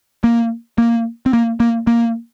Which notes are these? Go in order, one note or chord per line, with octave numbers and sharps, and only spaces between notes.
A#3
A#3
C4
A#3
A#3
A#3